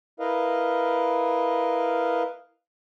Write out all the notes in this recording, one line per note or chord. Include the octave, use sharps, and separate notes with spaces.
E4 A#4 B4 D#5 F5